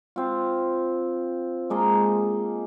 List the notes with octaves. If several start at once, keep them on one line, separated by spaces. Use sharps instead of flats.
C4 F4
G#3 A#3 D#5 A5